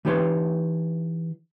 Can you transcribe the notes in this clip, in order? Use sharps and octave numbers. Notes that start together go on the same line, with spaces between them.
E3 D#4 G4 B4 C#5 C6